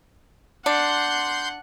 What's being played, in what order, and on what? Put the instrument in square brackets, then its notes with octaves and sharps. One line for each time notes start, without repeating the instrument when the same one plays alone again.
[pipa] D4 [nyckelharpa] F#5 [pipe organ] C6 G6